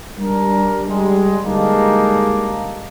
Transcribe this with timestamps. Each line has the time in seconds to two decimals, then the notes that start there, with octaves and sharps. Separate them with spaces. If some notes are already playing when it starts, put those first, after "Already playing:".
0.19 G3 D4 A#4
0.87 G3 G#3
1.44 D3 G3 G#3 A#3 D4 D#4